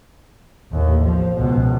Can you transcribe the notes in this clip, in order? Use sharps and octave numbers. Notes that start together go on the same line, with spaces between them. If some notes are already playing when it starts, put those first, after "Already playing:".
A1 D#2
F3
C#2 B2